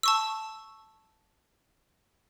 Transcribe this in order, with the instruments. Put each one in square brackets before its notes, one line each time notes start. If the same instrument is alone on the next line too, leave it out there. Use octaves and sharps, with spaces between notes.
[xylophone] A5 C#6 E6